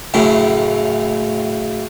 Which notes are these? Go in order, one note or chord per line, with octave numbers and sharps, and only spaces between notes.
F#2 A2 C#3